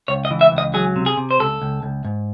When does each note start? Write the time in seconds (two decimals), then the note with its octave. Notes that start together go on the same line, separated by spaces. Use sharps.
0.08 C#2 C#5
0.25 D#5
0.31 E3
0.41 E5
0.52 C#2
0.58 D#5
0.74 F#3 G#4
0.96 C3
1.06 G#4
1.18 C3
1.31 C5
1.39 C#2 A4
1.62 C#2
1.83 C#2
2.05 G#2